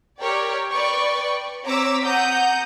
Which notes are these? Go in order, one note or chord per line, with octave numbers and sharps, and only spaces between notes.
G4 A#4 C#5 D5 G5
B4 D5 G5 C#6
C4 C#5 A#5 D6 E6 B6
F#5 A#5 D#6 G6